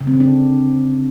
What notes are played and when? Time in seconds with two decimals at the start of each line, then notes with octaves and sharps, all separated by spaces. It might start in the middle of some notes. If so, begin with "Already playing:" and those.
0.01 C#3
0.07 C4
0.14 D3
0.20 D4